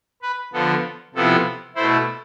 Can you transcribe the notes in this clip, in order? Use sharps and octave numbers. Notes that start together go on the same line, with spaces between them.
B4
D3 F3 B3 A4
C3 F3 B3 E4 A4
B2 A3 E4 C5